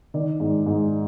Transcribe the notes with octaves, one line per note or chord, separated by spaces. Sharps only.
D#3 D5
G#2
G#2